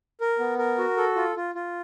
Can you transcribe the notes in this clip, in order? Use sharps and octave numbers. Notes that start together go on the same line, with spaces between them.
A#4
B3
A#4
F#4
A4
F4
F4
F4